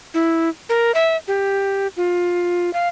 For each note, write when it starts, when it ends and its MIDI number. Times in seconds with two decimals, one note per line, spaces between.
0.14 0.49 64
0.69 0.94 70
0.95 1.17 76
1.28 1.88 67
1.97 2.73 65
2.73 2.88 77